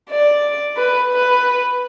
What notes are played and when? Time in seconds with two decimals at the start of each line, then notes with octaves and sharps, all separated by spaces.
0.10 D5
0.77 B4
1.11 B4